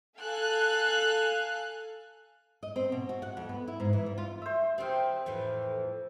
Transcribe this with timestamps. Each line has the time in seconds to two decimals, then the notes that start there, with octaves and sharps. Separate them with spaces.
0.18 A4 F5 G#5 F#6
2.63 D#5
2.76 C4
2.92 B2
3.09 F#4
3.22 F#5
3.37 F2
3.49 B3
3.67 E4
3.80 G#2
3.93 E3
4.06 G3
4.18 F4
4.42 C5 E5
4.78 D#3 G3 C4
5.26 F2 A2 E3